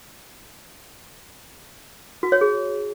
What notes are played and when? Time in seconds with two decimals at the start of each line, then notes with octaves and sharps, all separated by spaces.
2.23 F#4
2.32 C#5
2.41 G#4